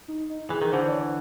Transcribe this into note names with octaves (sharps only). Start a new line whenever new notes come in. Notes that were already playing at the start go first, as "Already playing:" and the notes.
D#4
D#4
E3 G#4
D#3
D3 E3 C5
D5
C#5